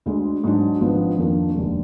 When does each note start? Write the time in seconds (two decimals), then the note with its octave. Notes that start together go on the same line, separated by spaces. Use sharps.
0.06 D2 D3 G#3
0.44 G#2 F#3 D4
0.80 G#1 G#2 F3 B3 D4
1.18 F2 D#3 A#3 D4
1.55 F1 D#2 D3 G#3